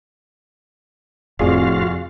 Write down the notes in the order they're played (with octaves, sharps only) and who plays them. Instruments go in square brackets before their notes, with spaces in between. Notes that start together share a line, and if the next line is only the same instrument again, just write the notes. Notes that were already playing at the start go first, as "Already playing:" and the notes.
[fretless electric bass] F1 A2 [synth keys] F2 G#4 D5 [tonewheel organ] F4 F#4 F5